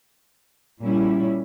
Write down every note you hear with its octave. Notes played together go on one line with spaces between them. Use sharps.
A#2 G3 C#4 E4